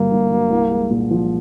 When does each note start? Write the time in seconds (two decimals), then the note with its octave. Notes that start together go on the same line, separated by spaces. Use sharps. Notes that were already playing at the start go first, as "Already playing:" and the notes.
Already playing: G1 G2 D3 F#3 A#3
0.12 G1
0.31 F#3
0.51 C2
0.71 G#3
0.91 A#2
1.11 F3